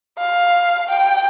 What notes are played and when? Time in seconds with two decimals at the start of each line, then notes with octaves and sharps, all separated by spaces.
0.18 F5
0.89 G5